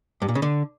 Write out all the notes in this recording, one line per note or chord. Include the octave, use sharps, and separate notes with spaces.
G2
A#2
C#3
D3